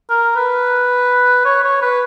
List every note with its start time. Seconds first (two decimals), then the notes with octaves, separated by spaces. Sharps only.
0.10 A#4
0.36 B4
1.45 C#5
1.64 C#5
1.82 B4